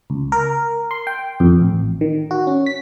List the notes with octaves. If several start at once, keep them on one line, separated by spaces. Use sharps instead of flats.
C#2
A#4
C6
G5
F2
A1
D#3
F#4
C#4
B6